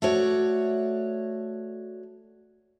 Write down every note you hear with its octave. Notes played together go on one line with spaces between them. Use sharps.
A3 F#4 C#5 D5